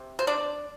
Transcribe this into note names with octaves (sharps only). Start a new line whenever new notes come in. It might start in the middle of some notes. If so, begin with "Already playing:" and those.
Already playing: C3
C5
D4 D5